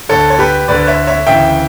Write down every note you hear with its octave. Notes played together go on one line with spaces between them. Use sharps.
D2 D3 A4 C#5
C#5
G4 B4
D2 D3 B4 D5
C#5 E5
C#5 E5
D2 C#3 E3 E5 G5